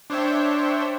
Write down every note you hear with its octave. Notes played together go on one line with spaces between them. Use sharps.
D4 C5 C#5 E5 G5